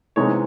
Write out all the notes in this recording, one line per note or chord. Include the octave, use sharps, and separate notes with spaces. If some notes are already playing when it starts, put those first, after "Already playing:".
C3 E3 G#3 B3 D#4 C#5